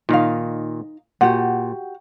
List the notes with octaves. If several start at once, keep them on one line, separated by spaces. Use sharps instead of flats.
A#2 D#3 D#4 F5
A#2 F#4 G4 F#5